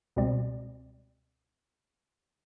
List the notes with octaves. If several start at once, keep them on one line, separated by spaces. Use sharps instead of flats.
C#2 B2 G3 C4 D5